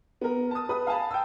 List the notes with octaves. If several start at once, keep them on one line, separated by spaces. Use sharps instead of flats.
B3 A#4
A5 D#6
B4 D#6
F5 G#5 A5 B5
G5 E6